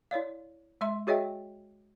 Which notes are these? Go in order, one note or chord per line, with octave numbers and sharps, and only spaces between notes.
E4 C#5 D5 F5
G#3 E5 C6
F#4 G#4 C#5 D#5 E5 G5